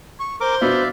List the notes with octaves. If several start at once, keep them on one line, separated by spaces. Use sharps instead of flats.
C#6
A#4 C5 D6
B2 B3 D4 D5 E5 F5